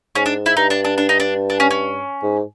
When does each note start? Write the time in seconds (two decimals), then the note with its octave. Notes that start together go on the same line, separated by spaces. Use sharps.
0.15 G#2 C#4
0.26 D4
0.46 E4
0.57 G2 D#4
0.70 D4
0.85 D4
0.98 D4
1.09 D#4
1.20 D4
1.50 D4
1.60 C#4
1.71 C#4
2.23 G#2